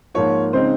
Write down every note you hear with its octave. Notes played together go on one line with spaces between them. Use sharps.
G#2 F3 A#3 F4 C#5
C#3 G#3 C4 D#4 C5